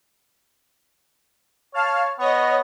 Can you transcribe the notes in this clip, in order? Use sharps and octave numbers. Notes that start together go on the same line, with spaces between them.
C#5 F5 A5 F6
B3 C#5 D#5 A#6